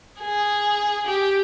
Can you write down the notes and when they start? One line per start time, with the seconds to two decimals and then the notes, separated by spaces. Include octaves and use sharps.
0.21 G#4
1.07 G4